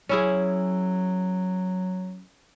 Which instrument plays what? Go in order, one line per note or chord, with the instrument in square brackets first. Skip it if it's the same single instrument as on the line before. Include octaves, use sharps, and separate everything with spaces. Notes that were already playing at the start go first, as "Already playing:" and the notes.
[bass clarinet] F#3 [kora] C#4 E4 G#4